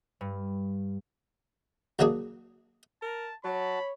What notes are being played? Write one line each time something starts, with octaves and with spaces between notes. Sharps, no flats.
G2
C#2 C#3 F#3 A#3 D4 G#4
A#4 A5
F#3 F#4 C#5 A5 B5